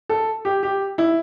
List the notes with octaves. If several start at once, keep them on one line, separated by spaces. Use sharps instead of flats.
A4
G4
G4
E4